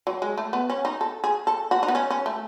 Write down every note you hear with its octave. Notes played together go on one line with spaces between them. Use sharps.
F#3
G#3
A3
B3
C#4
D#4
A4
G#4
A4
F#4
D#4
B3
C#4
C#4
A3